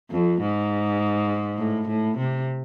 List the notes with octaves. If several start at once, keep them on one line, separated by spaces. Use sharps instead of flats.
F2
G#2
A2
A2
C3